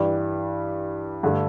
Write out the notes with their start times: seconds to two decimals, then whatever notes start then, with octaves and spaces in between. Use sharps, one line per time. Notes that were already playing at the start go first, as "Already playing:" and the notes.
Already playing: G2 E3 G3
1.23 G2 D3 A3